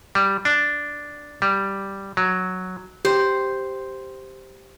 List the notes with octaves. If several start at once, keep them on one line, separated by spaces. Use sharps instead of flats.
G3
D4
G3
F#3
G4 C5